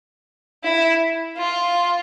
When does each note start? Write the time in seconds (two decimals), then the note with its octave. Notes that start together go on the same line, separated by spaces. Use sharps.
0.64 E4
1.37 F4